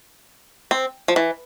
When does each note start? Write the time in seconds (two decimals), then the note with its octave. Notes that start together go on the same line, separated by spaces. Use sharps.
0.71 C4
1.08 F3
1.16 E3